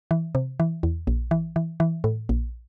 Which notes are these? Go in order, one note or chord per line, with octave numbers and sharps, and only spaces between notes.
E3
C3
E3
E2
A#1
E3
E3
E3
A2
A#1